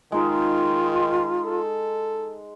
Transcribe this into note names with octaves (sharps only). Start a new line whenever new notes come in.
D#3 G#3 D#4 F4
A4